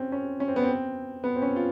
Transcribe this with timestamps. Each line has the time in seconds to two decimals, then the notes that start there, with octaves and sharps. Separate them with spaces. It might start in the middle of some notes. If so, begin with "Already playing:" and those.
Already playing: C4 C#4
0.12 C#4
0.40 C#4
0.48 C4
0.56 B3
0.63 C4
1.24 B3
1.36 C4
1.42 C#4
1.56 F4